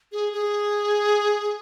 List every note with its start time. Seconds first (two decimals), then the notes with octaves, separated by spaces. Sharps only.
0.12 G#4
0.33 G#4